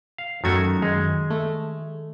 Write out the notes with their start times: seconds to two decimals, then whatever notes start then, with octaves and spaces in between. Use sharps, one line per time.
0.18 F5
0.44 F#2 D#3 A3 F#4 G#6
0.82 D#3 G#3
1.30 A3